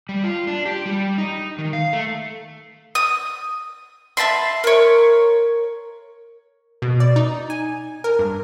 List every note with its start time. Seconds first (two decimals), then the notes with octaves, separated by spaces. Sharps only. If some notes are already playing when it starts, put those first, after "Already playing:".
0.09 G3
0.24 F4
0.47 D4
0.65 G4
0.86 G3
1.18 D#4
1.58 D#3
1.73 F5
1.93 A3
2.95 D#6
4.17 E5 A5 B5 C6
4.64 A#4 C#5
6.82 B2
7.00 D5
7.16 D#4
7.50 G#5
8.04 A#4
8.19 G2